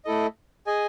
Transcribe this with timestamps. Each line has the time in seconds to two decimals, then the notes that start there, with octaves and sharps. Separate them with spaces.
0.05 A3 E4 A4 D#5
0.66 G#4 D#5 G#5